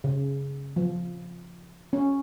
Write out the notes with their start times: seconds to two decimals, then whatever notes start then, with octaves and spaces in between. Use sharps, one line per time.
0.04 C#3
0.76 F3
1.93 C#4